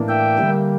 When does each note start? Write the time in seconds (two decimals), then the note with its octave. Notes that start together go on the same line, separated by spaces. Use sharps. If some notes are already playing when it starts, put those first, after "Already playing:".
Already playing: A2 E3 A#3 D4
0.08 E5 G5
0.38 D3 G3 A#3